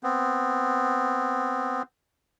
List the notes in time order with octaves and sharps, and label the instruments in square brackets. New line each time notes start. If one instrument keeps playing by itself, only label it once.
[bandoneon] B3 C4